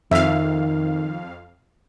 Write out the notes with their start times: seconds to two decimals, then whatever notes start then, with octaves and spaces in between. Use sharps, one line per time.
0.11 F2 D#3 E5 F5